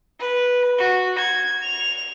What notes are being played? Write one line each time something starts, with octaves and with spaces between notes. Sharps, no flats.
B4
F#4
G#6
F7